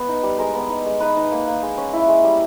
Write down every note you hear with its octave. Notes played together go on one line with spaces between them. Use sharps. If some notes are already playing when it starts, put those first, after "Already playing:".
Already playing: B3 B4
D#4
G3
G#3 A#4
B3
D#4
G#3
D#4 B4
D#4
A#3
A#3
G#3
C#4
E4
G#3
G3